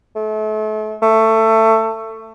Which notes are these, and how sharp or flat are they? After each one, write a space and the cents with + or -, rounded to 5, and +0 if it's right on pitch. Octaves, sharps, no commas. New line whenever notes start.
A3 -35
A3 +20